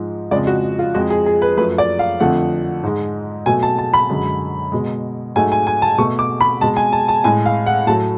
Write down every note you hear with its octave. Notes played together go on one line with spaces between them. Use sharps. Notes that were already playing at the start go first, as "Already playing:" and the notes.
Already playing: G#2 F3 G#3
F2 C#3 F3 G#3 D5
F#4
F4
F2 F3 G#3 F#4
G#4
G#4
B4
F#2 F3 A3 B4
D5
F5
F2 D3 F3 A3 F#5
G#2 G#3
B2 F#3 A3 G#5
A5
A5
B5
F#2 D3 G#3
B2 G#3
G#2 F#3 A3 G#5
G#5
G#5
A5
B2 A3 C#6
D6
B5
B2 G#3 A5
G#5
A5
A5
A2 G#3 G#5
F5
F#5
A2 F#3 A3 A5